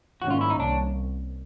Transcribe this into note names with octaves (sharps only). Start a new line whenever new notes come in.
G#2 D#3 G3 A#3 C#4 F#4
F4
E4
D#4
C2 D4